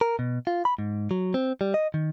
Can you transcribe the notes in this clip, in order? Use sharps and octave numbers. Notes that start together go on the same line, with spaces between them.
A#4
B2
F4
B5
G#2
F#3
C4
G3
D#5
D#3